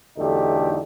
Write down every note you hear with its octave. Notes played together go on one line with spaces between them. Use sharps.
B1 E2 D3 A3 D#4 G4